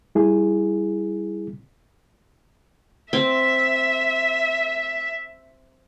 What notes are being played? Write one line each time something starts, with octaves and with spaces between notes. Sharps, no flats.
G3 E4 G#4
C4 E5